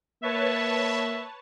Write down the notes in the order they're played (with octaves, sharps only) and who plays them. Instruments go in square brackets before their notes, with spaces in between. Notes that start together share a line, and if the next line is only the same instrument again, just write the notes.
[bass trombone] A#3 [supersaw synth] B4 C#5 A5 [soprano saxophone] E5